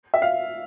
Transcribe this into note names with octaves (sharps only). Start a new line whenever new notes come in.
E5
F5